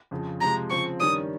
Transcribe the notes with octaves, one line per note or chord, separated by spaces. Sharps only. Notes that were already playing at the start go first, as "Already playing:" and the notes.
F2 C#3 F3
C3 F3 G#3 A#5
C#3 F3 C4 C#6
G2 D#3 G3 C#4 D#6